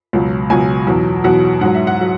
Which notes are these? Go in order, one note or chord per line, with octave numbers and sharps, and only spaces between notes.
C#2 B2 F#3
C#2 B2 F#3 G#5
E2 B2 F#3
E2 B2 F#3 F#5
G#2 F#3 F#5
E5
F#5
F#3